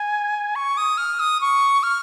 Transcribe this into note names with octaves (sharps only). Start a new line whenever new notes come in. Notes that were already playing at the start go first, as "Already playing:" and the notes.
Already playing: G#5
C#6
D#6
F6
D#6
C#6
F6